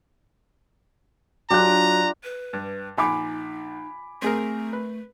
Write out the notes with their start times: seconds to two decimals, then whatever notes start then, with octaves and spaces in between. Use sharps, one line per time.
1.50 F#3 D4 F4 G4 A#5 F#6
2.23 B4
2.53 G2
2.98 A#1 D#4 G#5 B5 D6
4.22 A3 C4 G#4 A#4
4.73 B4